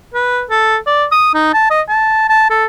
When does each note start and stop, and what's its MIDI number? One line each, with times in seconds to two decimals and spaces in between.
0.14 0.42 71
0.50 0.77 69
0.86 1.05 74
1.12 1.32 87
1.34 1.49 63
1.54 1.66 81
1.70 1.82 75
1.89 2.25 81
2.29 2.45 81
2.50 2.65 69